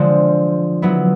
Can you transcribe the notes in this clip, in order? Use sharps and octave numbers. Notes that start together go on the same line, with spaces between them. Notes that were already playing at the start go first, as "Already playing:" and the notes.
Already playing: D3 F3 G#3 C4
F#3 B3 E4